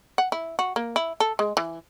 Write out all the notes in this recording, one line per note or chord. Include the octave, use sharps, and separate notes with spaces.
F#5
E4
F#4
A#3
E4
A4
G#3
E3